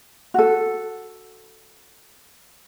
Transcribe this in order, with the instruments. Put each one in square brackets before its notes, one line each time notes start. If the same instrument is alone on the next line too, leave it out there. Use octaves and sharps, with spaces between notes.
[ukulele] F#4 A4